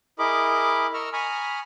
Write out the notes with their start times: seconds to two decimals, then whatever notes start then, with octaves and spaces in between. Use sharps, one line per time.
0.19 E4 G#4 A#4 D#5 B5 D6
0.94 A#4 D#5 A#5 C#6 E6 F6
1.13 G#5 A#5 B5 C#6 D#6 F6